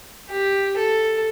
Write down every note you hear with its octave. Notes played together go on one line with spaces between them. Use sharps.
G4
A4